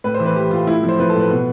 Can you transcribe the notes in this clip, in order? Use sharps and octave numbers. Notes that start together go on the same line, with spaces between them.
A2 B4
C5
E3
B4
E3 G4
A2 F4
A2 E4
F3
C5
F3 B4
A4
A2
B4
B2